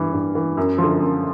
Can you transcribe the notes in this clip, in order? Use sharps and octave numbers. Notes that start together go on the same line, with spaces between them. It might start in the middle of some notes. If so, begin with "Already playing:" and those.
Already playing: G2 E3
G2
E3
F#2
F3
D3
F#2